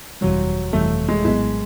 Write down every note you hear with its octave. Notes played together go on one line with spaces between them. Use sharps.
G1 F2 C3 E3 F#3 G3
G1 F2 C3 E3 G3 A3
G#3
A#1 A2 F#3 G#3 B3 E4